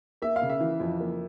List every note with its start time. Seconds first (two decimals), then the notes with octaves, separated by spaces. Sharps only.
0.22 A#3 E5
0.36 F5
0.42 C#3
0.49 E5
0.60 E3
0.80 F2
1.00 A#3